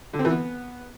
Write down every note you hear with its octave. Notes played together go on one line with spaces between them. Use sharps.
D3
C4
E3
B3